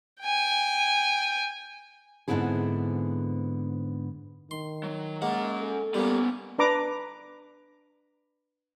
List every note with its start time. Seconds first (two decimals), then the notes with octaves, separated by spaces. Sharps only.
0.22 G5 G#5
2.28 G#2 D3 B3 C4 E4 G#4
4.51 D#3 C6
4.83 F#3
5.22 G#3 A#3 C#4 F#5
5.61 A4
5.94 G3 A#3 B3 C#4
6.58 D4 B4 A#5 D6